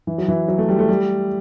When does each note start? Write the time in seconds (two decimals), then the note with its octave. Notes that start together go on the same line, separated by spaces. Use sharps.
0.07 E3
0.18 F#3
0.28 E3
0.48 F#3
0.58 A3
0.69 G3
0.79 A3
0.89 G3